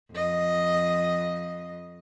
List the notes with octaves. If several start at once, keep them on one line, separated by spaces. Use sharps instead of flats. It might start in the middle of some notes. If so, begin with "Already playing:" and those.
F2 D#5